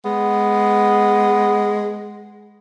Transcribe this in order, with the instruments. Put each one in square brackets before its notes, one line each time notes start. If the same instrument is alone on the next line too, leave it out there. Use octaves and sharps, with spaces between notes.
[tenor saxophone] G#3 [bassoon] B3